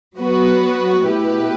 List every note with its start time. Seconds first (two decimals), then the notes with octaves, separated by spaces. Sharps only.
0.18 F#3 B3 F#4 B4
1.02 B2 A3 E4 G4 B4